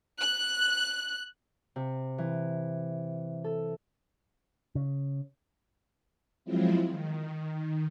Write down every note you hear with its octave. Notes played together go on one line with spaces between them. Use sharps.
F#6
C3
E3
A4
C#3
F3 F#3 G#3 C4 E4 F4
D#3